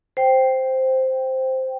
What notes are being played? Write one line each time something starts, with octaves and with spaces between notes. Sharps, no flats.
C5 G5